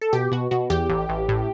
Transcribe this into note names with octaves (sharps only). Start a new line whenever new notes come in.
A4
B2 G4
B2 F#4
B2 F#4
E2 G4
A1
A1
A2